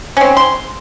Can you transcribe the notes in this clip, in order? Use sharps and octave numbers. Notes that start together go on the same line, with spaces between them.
C4 C#4
C6